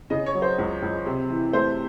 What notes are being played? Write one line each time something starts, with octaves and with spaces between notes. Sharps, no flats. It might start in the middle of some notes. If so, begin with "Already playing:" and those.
C#3 D#5
C#5
F#3
C5
C#2
C#2
C3
E3
A3 C5